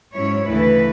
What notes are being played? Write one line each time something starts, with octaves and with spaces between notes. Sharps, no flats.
G#2 F#3 C#4 E4 C#5
D2 C#3 E3 A3 E4 B4